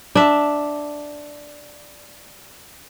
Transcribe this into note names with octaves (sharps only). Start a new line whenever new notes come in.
D4 E5